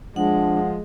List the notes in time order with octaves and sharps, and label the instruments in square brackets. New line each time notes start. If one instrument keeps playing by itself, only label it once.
[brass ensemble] F3 [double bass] G#3 [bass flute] D4 [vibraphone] F#5